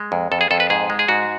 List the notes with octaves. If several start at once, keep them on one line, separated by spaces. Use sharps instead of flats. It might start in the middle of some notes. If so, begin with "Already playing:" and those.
Already playing: G#3
F2
F2 A4
G#4
F2 A4
B4
G#2 G#4
G#3
G#4
G#2 F#4